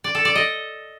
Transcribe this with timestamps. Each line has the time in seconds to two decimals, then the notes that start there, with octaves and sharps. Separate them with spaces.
0.04 D5
0.15 A4
0.25 D5
0.35 D#5